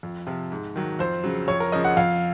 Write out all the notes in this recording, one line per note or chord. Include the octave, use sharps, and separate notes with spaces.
F2
C3 F3
G#2
D#3 F#3
F2 C5
C#3 F#3
F2 C#5
A#4
C#3 F3 D#5
F#5
F2 F5